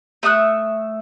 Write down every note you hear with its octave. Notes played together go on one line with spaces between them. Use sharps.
A3 E5 D#6 F#6